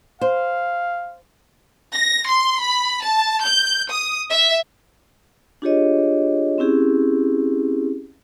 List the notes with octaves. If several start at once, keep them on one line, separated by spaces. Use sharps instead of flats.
C5 F5
A#6
C6
B5
A5
G6
D#6
E5
D4 F4 G4 G#4 C#5 D#5
C4 C#4 E4 G4 G#4